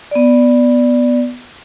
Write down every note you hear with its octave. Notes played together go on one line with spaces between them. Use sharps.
B3 D5